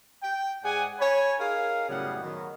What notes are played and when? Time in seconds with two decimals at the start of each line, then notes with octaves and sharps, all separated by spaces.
0.23 G5
0.64 G#2 G#4 D5 F#5 G#5
1.00 C#5 G#5 B5
1.39 D#4 G#4 A#4 F5
1.89 F#2 A2 C#3 G3 B3 F#5
2.23 D#3 F#3 B3